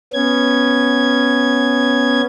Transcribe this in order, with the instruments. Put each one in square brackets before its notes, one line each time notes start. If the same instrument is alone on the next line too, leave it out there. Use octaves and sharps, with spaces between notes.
[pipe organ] B3 C#4 G#6